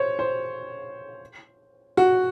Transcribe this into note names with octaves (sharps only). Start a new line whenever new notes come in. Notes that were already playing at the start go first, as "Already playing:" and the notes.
Already playing: C5 C#5
C5
F#4